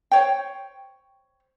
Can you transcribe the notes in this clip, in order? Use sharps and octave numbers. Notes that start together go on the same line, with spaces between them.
C5 C#5 G5